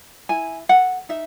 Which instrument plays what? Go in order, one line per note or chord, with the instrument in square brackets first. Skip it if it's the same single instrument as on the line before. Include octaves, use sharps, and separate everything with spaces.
[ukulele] E4 G#5
A4 F#5
D#4 E5